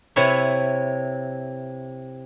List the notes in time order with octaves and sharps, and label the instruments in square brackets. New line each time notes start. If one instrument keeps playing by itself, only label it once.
[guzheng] C3 E4 B4 C#5 E5